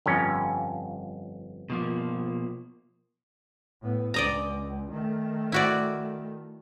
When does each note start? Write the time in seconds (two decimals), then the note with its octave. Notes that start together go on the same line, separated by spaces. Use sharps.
0.06 G1 F2 C#4
1.70 B2 F3 A#3
3.82 A2 B3
4.14 C#2 D5 D#5 A#5
4.91 D#3 A3
5.52 E4 F#4 D5